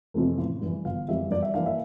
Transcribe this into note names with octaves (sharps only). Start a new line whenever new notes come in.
F2 C3 E3 A3
A1
G2 E3
G1 F5
F2 E3 G3 E5
G2 D5
E5
E3 A#3 D4 F5
E5